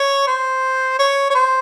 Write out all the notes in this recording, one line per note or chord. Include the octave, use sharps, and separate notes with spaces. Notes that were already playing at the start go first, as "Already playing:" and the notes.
Already playing: C#5
C5
C#5
C#5
C5